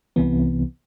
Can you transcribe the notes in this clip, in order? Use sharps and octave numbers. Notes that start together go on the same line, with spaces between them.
C2 C3 E3 B3